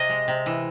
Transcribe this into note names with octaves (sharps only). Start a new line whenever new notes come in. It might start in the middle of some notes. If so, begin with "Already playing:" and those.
Already playing: C3 D#5
G#3
C3
E3